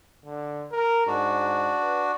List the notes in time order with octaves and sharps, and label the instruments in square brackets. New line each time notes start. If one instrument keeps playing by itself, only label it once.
[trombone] D3
A#4
[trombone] G#2 [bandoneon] D4 F#4
[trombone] B4